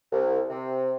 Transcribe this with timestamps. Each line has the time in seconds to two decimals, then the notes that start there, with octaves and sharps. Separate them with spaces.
0.12 C2
0.50 C3